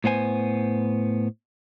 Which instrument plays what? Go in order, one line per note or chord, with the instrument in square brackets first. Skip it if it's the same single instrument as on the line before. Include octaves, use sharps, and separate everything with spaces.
[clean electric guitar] A2 B3 C5 G#5